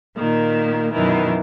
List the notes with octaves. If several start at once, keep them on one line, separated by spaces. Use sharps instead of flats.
A#2 D#3 A#3
F#2 B2 D#3 E3